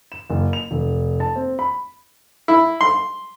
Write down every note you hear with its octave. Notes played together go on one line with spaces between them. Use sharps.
E7
F#1
F7
F1
A5
C4
B5
E4
C6